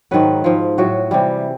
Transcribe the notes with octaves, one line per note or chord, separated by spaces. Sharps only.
G#2 D#3 F#3 B4
G#2 F3
A2 F#3 F#4
C3 E3 G3